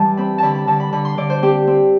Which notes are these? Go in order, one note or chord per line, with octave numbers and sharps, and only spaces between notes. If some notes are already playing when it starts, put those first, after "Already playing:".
Already playing: E3 G3 A5
C4 B5
D3 A5 B5
B5
D3 A5
B5
D3 B5
C6
D3 D5
C5
C4 G4
C4